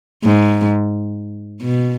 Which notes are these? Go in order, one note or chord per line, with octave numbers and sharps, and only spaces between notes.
G#2
B2